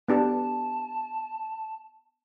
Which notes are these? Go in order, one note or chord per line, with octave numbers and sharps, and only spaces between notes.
B3 D4 G4 A5